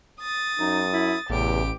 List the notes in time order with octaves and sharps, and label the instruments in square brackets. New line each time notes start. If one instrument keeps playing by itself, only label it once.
[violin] D#6 A6
[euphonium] F#2 [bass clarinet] D#4
[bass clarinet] E4
[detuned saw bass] A1 [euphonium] E2 [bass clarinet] C3 [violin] G4 D7